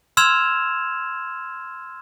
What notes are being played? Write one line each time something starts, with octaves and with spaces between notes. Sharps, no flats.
C6 E6 F6 G#6 E7 F7